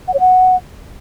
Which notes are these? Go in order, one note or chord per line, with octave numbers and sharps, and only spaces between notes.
F#5
C#5
F#5